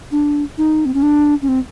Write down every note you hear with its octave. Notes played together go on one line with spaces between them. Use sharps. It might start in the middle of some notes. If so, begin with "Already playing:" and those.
D4
D#4
C4
C#4
D4
C#4
C4